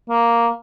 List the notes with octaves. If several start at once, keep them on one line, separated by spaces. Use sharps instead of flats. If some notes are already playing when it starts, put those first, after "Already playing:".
A#3